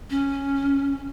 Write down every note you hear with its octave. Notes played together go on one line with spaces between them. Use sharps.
C#4